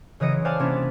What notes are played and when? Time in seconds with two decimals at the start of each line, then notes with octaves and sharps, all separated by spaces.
0.20 C#3 E3 F#3 D#5 C#7 D7
0.32 G#3
0.45 C5 D5 F5 F#5 G#5 A5
0.60 C3 A#3 C#4 D4 E4
0.71 D5